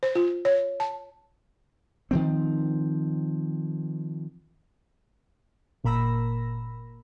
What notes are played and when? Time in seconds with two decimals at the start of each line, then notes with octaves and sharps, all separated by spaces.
0.03 C5
0.15 F4
0.45 C#5
0.80 A5
2.11 D#3 F3 C4
5.84 G1 A#2 A#4 B5 E6 A#6